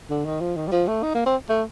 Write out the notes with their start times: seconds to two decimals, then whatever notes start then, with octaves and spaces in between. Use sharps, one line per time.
0.10 D3
0.25 D#3
0.41 F3
0.56 D#3
0.68 G3
0.72 F3
0.88 A3
1.03 D#4
1.15 A#3
1.26 C4
1.49 A3